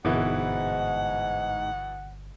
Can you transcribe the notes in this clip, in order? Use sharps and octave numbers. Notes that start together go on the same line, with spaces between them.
G1 G#2 B2 E3 E4 F#5